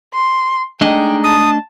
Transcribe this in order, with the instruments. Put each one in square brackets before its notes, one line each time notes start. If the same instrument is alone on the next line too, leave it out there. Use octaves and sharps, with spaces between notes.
[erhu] C6
[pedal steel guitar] G#3 D#4 [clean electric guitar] A3 D4 D#5 [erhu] G5
[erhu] A5 [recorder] D#6